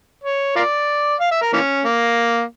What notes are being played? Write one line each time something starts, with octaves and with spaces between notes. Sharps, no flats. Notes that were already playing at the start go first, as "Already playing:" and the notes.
C#5
F4 A#4 D5
F5
E5
A#4
E3 A#3 C#4
A#3